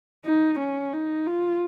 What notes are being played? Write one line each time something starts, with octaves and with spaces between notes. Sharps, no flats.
D#4
C#4
D#4
F4